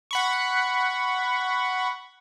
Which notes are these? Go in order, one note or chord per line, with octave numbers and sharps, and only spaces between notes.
F#5 B5 C#6